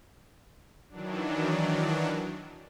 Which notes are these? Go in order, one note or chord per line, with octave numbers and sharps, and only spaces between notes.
D#3 E3 F#3 D4